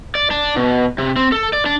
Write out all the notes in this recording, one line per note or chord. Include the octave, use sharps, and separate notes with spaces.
D5
D4
B2
C3
C4
A4
D5
D4